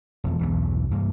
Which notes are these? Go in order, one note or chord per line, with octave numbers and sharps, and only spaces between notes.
E1 F2
B1 E2 G2 E3
C2 G2 A#3